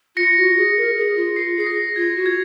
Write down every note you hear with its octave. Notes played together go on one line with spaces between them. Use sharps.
F4 A#6 C#7
F#4
G#4
A#4
G#4
F4
F4 C7
G#4 C7
A#6
F4 G#6
F#4
G#6